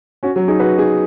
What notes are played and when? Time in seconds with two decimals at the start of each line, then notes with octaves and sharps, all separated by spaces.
0.23 C#4 F#4
0.36 F#3
0.48 D#4 G#4
0.60 F#4 B4
0.78 D#4 G#4